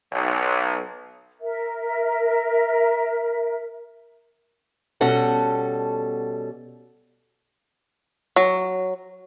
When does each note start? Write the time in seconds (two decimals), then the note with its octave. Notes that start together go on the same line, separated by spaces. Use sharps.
0.12 B1
1.40 A#4 E5
5.01 B2 G3 C#4 A4 F#5
8.36 F#3